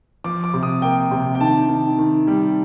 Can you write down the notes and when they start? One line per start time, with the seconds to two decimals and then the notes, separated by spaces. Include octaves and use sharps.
0.24 F3 D6
0.44 D6
0.54 C3
0.63 D#6
0.82 A#3 G5
1.11 C3
1.35 G5
1.40 D#3 A5
1.69 D#3
1.98 D#3
2.27 G3